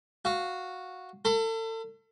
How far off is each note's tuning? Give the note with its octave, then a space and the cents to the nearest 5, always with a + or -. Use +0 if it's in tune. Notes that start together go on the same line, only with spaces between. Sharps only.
F#4 -5 F5 +0
A4 +35 B5 +45